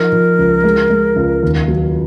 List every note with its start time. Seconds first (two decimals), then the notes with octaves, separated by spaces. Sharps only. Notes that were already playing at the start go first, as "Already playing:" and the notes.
Already playing: F3 D#4 A#4
0.12 F3
0.39 C#2
0.64 G#3
0.90 G#3
1.16 C#2
1.43 D#2
1.68 F#3